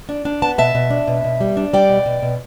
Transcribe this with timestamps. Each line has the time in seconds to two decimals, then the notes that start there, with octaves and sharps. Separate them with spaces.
0.09 D4
0.25 D4
0.42 B3 A5
0.58 B2 E5 A5
0.75 B2
0.90 D4
1.08 B2
1.24 B2
1.41 G3
1.57 D4
1.73 G3 D5 G5
1.89 B2
2.06 B2
2.23 B2